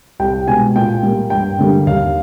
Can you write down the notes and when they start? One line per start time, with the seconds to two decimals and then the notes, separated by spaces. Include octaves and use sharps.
0.19 C2 G5
0.47 B2 G#3 G#5
0.75 A#2 G5
1.03 G3 A#3
1.30 G2 G5
1.58 D3 G3 A#3
1.87 D#2 F5